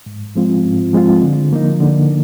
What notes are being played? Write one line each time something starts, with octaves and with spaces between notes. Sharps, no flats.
G#2
F3 G#3 C4 F4
G#2
F3 G#3 C4 F4
D3
F3 A#3 D#4
D3